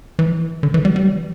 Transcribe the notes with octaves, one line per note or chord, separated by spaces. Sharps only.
E3
D3
E3
G3
G3
F#3
E3